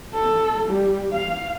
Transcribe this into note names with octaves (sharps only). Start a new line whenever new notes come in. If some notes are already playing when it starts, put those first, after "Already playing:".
A4
G3
F5